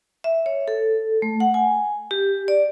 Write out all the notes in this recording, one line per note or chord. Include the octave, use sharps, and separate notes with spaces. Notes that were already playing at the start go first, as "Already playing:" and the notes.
E5
C#5
A4
A3
F#5
G#5
G4
D5